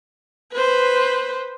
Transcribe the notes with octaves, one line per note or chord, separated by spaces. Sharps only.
B4 C5